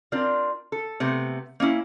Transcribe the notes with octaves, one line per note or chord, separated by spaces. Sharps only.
C4 D4 F4 A#4 D5
A4
C3 A3 B3
A#3 C#4 D#4 E4